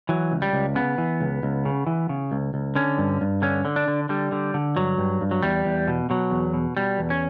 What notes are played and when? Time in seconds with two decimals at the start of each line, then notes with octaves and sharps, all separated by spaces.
0.09 E3 F#3
0.32 C#2
0.42 G3
0.53 C#2
0.75 C#3 B3
0.98 E3
1.21 C#2
1.43 C#2
1.65 C#3
1.87 E3
2.09 C#3
2.32 C#2
2.54 C#2
2.75 D3 C#4
2.98 G2
3.21 G2
3.42 D3 C#4
3.65 D3
3.76 D4
3.88 D3
4.09 D3 G3
4.32 D3
4.54 D3
4.76 G2 F#3
4.98 G2
5.21 G2
5.31 F#3
5.43 E2 G3
5.65 E2
5.88 B2
6.10 B2 F#3
6.31 E2
6.54 B2
6.77 B2 G3
6.99 E2
7.10 C#4